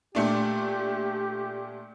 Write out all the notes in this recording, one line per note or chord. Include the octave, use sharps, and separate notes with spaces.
A#2 A3 D4 G4